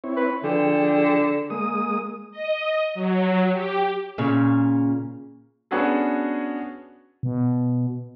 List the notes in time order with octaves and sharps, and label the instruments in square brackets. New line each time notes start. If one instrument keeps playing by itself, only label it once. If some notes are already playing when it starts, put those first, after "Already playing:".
[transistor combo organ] C4 E4 C#5
[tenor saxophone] B4
[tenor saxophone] D3 [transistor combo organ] F3 G#4 G5
[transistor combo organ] G#3 A#3 D#6
[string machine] D#5
F#3
G4
[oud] A#2 C#3
[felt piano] B3 C#4 D4 F#4 G#4 A4
[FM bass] B2